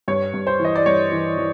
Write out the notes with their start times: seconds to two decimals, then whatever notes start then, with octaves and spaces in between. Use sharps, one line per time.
0.08 G2 C#5
0.34 G2
0.47 C5
0.59 E3
0.65 D#5
0.76 D5
0.86 G2 C#5
1.12 E3
1.38 E3